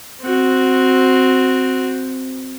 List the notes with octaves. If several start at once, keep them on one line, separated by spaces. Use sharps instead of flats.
C4 F#4